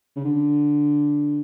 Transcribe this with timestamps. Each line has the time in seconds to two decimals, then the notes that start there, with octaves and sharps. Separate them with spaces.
0.16 C#3
0.25 D3